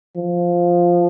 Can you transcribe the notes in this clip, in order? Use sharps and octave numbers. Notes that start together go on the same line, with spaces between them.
F3